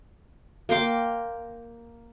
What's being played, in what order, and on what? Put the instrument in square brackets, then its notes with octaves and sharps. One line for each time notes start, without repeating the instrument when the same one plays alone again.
[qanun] A#3 G5 C6 D6